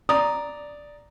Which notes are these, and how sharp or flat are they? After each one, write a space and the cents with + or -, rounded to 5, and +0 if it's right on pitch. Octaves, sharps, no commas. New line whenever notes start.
D5 +0 A#5 +0 D#6 +0